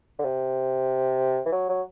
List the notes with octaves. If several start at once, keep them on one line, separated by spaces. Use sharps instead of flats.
D3
C3
E3
F#3
F#3